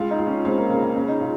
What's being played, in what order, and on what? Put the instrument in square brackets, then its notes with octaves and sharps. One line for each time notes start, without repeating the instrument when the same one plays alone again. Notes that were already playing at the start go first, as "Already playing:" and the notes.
Already playing: [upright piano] C#2 [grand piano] F4
[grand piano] D#4
[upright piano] C#2
[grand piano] C#4
[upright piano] C#2 [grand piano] C4
[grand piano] A#3
[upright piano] C#3 [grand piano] A#3
[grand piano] A#3
[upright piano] C#3 [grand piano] C#4
[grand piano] D#4
[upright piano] C#3 [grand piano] F4